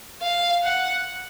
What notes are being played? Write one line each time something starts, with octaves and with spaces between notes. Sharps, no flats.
F5
F#5